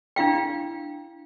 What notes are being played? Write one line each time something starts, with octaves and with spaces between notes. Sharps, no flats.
D4 E4 F5 G5